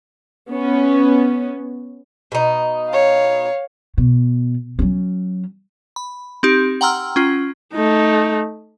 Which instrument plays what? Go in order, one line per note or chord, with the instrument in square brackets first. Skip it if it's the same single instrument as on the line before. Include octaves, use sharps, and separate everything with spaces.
[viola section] B3 C#4
[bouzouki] B2 D#4
[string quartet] C#5 F5
[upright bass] B2
F#3 C#4
[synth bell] B5
C4 D#4 G4
F#5 G5 A#5 C6 E6 F6
C#4 F4
[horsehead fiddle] A3 D#4